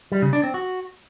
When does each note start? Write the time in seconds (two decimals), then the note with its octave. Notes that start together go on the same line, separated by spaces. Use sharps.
0.12 G3
0.22 C#3
0.33 D4
0.43 C4
0.54 F#4